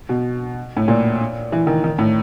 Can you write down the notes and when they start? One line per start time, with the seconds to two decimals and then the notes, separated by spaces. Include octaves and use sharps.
0.09 B2
0.77 A2
0.88 A#2
1.52 E3
1.67 D#3
1.84 D#3
1.98 A2